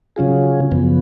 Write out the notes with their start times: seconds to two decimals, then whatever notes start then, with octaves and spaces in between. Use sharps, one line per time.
0.16 C#3 F#3 C#4 F4 G#4
0.71 F#2 C#3 F3 B3